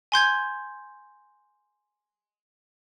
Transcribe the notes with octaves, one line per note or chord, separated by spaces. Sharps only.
G#5 C6 G6 G#6